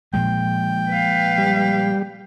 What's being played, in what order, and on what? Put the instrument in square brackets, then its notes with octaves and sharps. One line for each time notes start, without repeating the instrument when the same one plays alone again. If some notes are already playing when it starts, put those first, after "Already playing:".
[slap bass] A#2 F3 G#3 [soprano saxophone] G5
[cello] B4 F5
[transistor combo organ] G3